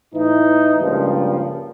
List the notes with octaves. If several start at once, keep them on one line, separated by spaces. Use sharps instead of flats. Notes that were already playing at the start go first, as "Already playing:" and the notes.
A2 E3 D#4
C#2 G2 A#2 F3